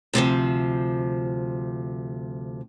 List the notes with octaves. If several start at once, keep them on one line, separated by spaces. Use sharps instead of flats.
D2 C3 D#3 F3